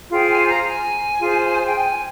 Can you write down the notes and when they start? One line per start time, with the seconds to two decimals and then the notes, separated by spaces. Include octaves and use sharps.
0.10 F4 G#4 C5 G5
0.28 G#5
0.47 A#5
0.66 G#5
1.20 F4 G#4 C5
1.66 G5
1.75 G#5